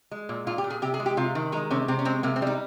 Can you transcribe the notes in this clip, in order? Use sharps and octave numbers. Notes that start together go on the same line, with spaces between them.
G#3
A#2
A#2 F4
G4
A#2
G#4
C3 G4
G#4
G#3
G4
C3 F4
D#3
G#3 D#4
C3 C#4
C3 C4
C#4
G#3 C4
C3 A#3
C4
G3 D#4